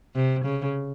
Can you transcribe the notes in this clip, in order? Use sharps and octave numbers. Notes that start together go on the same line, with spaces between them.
C3
C#3